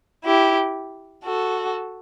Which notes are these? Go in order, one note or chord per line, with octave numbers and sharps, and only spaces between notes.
E4 G4
F#4 A4